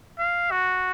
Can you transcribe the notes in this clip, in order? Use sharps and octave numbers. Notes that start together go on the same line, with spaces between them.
F5
F#4